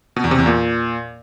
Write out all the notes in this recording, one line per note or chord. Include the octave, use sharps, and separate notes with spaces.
B2
E2
C3
E2
A#2